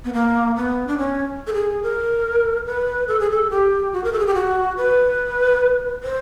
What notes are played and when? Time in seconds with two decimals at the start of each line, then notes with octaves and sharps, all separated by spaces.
0.05 B3
0.13 A#3
0.56 B3
0.87 D4
0.98 C#4
1.47 A4
1.54 G#4
1.83 A#4
2.67 B4
3.08 A4
3.20 G#4
3.30 A4
3.50 G4
3.93 F#4
4.04 A#4
4.13 A4
4.19 G#4
4.27 G4
4.34 F#4
4.77 B4
6.03 C5